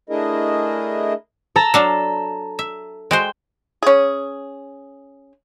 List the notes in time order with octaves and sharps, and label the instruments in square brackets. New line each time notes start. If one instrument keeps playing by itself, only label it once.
[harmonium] A3 D4 E4 G#4 A#4 D#5
[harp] A4 A5 A#5
[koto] F#3 D4 F5
E5
[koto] G#3 F#4 C5 [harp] G5
[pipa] C#4 G#4